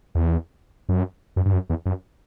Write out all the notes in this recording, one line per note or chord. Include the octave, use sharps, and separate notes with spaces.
E2
F#2
F#2
G2
F#2
E2
F#2